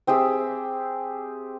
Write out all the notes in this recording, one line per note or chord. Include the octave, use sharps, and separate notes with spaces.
C4 G4 G#4 E5